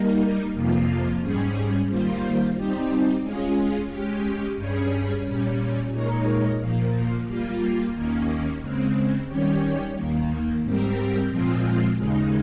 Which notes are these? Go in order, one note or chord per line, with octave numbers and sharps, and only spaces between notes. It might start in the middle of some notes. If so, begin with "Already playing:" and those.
Already playing: G3 A#3 D#4 A#4
F2 C3 F3 A#3 F4
G#2 G3 C#4 G#4
D#3 G3 A#3 F4 C5
G3 C4 D#4 G4
G#3 C#4 F4 G#4
G#3 C#4 G4
G2 G3 C#4 G#4 C#5
A#2 G3 C#4
A#2 G#3 D#4 A#4 C#5
A#2 F3 A#3
G3 A#3 F4
D#2 D#3 A#3 C#4
C#3 G#3 C4
D#3 G3 C#4 G4 C#5
D#2 D#3 A#3
G#2 G3 C4 G4 A#4
A#2 F3 G#3 C4 F4
D#2 C#3 G#3 D#4